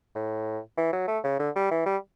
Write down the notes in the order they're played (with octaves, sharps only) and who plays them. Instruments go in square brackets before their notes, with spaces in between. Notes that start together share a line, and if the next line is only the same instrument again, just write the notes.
[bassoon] A2
E3
F#3
A3
C#3
D3
G3
E3
G3